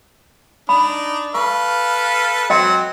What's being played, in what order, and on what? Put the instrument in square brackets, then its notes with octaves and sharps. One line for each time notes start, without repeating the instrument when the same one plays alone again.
[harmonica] D4 D#4 [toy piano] B5
[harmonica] A4 B4 F5 [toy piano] C#6
[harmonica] F#3 C4 [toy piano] D#5 G5 C6